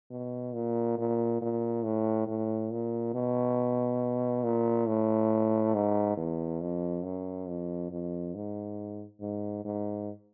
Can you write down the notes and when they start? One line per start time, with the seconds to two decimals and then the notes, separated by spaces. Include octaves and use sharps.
0.11 B2
0.54 A#2
0.98 A#2
1.41 A#2
1.84 A2
2.27 A2
2.71 A#2
3.14 B2
4.43 A#2
4.87 A2
5.74 G#2
6.17 E2
6.61 F2
7.04 F#2
7.48 F2
7.91 F2
8.35 G#2
9.21 G#2
9.65 G#2